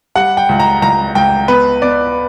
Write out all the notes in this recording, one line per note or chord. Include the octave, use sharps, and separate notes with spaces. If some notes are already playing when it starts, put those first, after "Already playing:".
G3 F#5
G5
C#2
A#5
C#2 A#5
C#2 G5
B3 B4
B3 D5